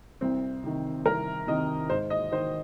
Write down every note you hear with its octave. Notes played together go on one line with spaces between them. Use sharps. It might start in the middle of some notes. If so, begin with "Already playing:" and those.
C2 C4
C3 D#3
C2 A#4
C3 D#3 D#5
G#2 C5
D#5
D#3 C5